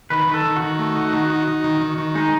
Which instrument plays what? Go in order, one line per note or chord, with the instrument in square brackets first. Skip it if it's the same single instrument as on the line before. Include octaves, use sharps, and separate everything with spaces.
[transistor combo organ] D#3 [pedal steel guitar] B4
[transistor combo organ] D#3
[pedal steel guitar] A4
[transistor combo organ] D#3
[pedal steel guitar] F#4
[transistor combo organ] D#3
A3
D#4
D#3
D#4
D#4
D#3
D#3
D#3
[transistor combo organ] G#3 [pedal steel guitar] D#4